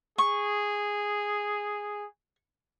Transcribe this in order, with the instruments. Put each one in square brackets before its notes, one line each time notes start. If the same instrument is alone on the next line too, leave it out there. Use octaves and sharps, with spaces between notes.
[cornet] G#4 [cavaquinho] C#6